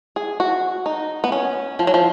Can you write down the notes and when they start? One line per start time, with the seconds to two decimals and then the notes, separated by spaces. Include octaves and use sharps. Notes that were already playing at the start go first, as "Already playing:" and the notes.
0.16 G#4
0.40 F#4
0.86 D#4
1.24 B3
1.32 C#4
1.79 F3
1.87 F#3
1.94 F3